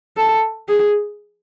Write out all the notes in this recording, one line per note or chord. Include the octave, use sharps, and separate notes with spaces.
A4
G#4